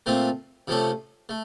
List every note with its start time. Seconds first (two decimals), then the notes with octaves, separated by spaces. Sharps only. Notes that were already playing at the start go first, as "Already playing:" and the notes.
0.06 A#2 A3 C4 F4
0.67 C3 F3 A3 C#4 A4
1.29 A3